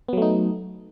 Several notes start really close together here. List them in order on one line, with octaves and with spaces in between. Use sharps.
B3 F#3 A3 D#4